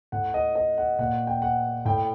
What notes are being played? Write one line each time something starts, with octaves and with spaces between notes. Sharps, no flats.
A2 F#5
D#5
D#5
F#5
A#2 F#5
G5
F#5
A2 G5